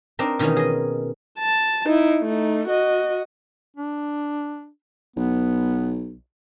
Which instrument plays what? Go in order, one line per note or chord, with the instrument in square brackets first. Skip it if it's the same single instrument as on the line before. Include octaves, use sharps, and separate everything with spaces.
[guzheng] C4 D4 D#4 A#4
B2 D#3 E3 C#4 D#4
G#4 D#5
[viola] A5
D#4 E4
A3 D#4
F#4 D#5
[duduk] D4
[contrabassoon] B1 [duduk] B3